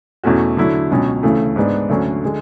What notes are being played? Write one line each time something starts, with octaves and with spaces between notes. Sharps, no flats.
E2 B2 A3 C#4 F#4
D3 F#3 A3 E4
C#2 B2 F#3 C#4
D2 C#3 E3 A3
G#2 G#3 B3 D4
D2 D3 F#3 C#4
D3 G#3